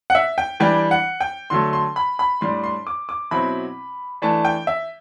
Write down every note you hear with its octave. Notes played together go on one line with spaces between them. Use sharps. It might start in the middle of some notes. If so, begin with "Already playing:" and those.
F#5
E5
G5
E3 G3 D4 G5
F#5
G5
D3 F#3 A3 C6
C6
B5
B5
A2 G3 D4 C6
C6
D6
D6
B2 F#3 C4 E4 B5
E3 A3 D4 A5
G5
E5